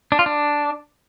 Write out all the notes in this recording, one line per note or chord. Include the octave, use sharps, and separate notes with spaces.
D4
F4
D4